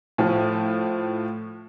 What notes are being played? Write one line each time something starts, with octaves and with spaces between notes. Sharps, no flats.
A2 F3